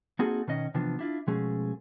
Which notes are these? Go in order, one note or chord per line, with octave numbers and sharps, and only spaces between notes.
A#3 C4 D#4 F#4 G#4 A4
B2 D#3 C#4 D#5
C3 E3 F3 B3 D4
D4 E4 F4
B2 F3 G#3 A3 C#4 G#4